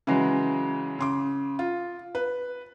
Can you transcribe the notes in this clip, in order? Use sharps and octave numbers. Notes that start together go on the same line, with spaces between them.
C#3 E3 F#3 G#3
C#3 C6 D6
F4
B4